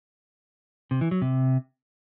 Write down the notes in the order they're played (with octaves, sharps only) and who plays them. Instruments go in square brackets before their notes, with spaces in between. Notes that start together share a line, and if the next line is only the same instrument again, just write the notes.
[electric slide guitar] C3
E3
F#3
C3